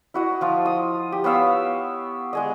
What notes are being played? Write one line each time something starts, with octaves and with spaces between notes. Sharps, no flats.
E4 F#4 D#5
F3 F4
D#6
G4
B3 C#5 F5 E6
G#3 G#4 D#5